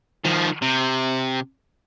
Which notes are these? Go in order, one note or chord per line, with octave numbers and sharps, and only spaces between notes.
D#3 F3
C3